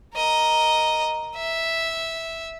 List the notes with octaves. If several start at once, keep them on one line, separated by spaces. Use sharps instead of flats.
A#4 D#5
E5